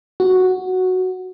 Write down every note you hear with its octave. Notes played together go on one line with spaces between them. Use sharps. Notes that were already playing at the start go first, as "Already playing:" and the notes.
F#4